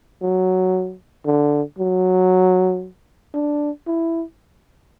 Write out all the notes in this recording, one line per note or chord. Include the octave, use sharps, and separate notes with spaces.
F#3
D3
F#3
D4
E4